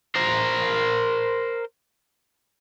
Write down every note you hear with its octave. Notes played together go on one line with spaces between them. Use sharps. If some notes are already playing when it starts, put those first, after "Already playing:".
A#4 C5